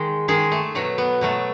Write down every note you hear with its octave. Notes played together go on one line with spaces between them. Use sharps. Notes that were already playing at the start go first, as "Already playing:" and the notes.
Already playing: D#3 G#3 G#4
D#3 G#3 G#4
A3
B2 F#3 A3
B3
B2 F#3 A3